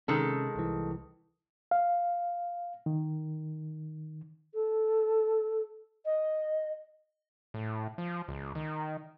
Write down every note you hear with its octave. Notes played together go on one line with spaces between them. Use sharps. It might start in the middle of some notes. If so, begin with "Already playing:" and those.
C3 D#3 G#3 C#4 A4
C2 E3
F5
D#3
A4
D#5
A2
F3
C#2
D#3